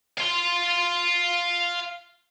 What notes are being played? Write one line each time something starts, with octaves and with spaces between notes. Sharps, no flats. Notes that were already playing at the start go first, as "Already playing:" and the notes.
F5 C6